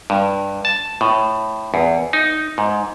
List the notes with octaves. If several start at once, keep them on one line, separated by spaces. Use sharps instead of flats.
G2
A5
A2
E2
D#4
G#2